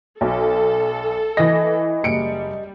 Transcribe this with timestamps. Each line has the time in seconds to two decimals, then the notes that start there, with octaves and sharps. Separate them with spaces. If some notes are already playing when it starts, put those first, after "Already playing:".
0.21 B1 A4
1.37 E3 D#5 A#6
2.03 F#1 G3 C#7 D7